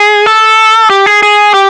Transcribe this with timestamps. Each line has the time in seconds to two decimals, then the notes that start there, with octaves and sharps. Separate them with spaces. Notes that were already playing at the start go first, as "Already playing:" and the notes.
Already playing: G#4
0.26 A4
0.90 G4
1.06 G#4
1.23 G#4
1.54 G4